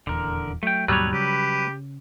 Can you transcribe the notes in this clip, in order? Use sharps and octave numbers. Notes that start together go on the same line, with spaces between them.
D#1 E2 D3 A#4
F#3 A3 G5
D#2 G#2 B2 F#3 G3 B4 C#5
C#3 G4 B4